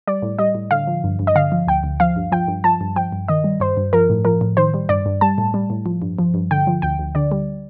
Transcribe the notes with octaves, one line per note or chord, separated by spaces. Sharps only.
G3 D5
A2
G3 D#5
A2
D3 F5
F3
G2
G2
D#5
D3 F5
F3
D2 G5
D2
F3 F5
G2
F3 G5
G2
F3 A5
G2
F3 G5
G2
D#3 D#5
G3
G2 C5
G2
F3 A#4
A2
F3 A#4
A2
D#3 C5
G3
G2 D5
G2
G3 A5
A2
G3
A2
F3
G2
F3
G2
D3 G5
F3
D2 G5
D2
D3 D5
G3